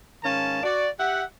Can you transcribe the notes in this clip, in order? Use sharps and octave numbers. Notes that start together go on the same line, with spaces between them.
G#2 D#3 C#4 F5 A5
F#4 D5
G4 E5 F#5